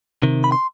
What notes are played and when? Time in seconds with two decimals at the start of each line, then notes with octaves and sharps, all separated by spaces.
0.23 C3 D#3
0.44 B5
0.52 C6